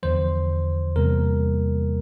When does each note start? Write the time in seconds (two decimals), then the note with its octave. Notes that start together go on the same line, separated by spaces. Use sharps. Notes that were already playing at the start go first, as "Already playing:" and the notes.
0.03 E2 D3 F3 C5
0.96 E2 C3 G3 A#3 A#4